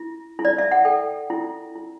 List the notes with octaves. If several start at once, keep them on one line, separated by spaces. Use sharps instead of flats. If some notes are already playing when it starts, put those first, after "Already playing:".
Already playing: E4
E4
D5
E5
F#5
A4 G5
E4
E4